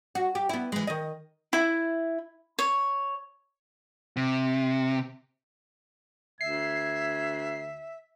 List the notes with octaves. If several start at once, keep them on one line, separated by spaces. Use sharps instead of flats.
F#4
G4
B3 E4
E3 G#3
D#3 D#5
E4
C#5
C3
D2 E5 G#6 C7